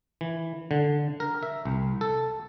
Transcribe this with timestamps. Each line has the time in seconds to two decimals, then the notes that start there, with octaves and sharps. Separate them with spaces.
0.21 E3
0.71 D3
1.20 A#4
1.43 E5
1.65 C2
2.01 A4